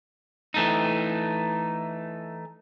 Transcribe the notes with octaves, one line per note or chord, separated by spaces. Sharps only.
E3 A3 D#4